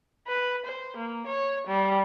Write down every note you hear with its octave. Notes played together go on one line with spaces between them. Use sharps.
B4
C5
A#3
C#5
G3